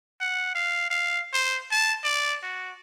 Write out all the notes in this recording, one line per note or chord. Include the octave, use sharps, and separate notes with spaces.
F#5
F5
F5
C5
A5
D5
F#4